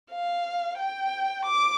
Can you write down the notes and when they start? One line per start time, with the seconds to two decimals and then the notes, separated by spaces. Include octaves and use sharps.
0.11 F5
0.78 G5
1.45 D6